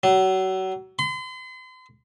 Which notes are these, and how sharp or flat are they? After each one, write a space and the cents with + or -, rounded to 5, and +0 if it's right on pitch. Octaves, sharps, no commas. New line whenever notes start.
F#3 +30
C6 -40